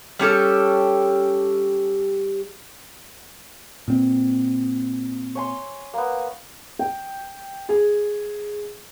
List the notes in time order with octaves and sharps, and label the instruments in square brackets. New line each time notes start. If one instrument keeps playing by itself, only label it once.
[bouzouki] G3 C#4 G4 A4
[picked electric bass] A#2 C4
[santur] C#5 G#5 C6
A#3 B3
[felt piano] G5
G#4